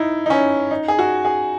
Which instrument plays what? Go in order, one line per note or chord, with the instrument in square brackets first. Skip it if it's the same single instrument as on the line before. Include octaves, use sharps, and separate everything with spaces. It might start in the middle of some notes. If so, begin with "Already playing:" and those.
Already playing: [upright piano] D#4 E4
D#4
C#4
D#4
G#4
F#4
G#4